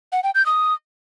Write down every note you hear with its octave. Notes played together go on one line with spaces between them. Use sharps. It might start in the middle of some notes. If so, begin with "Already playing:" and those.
F#5
G5
G6
D#6